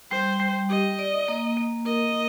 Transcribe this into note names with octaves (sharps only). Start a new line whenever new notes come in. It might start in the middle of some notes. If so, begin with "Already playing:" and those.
G3 C5
G3
G4 D#5
D5
A#3
A#3
A#4 D#5